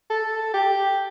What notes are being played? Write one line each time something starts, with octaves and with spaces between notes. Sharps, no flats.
A4
G4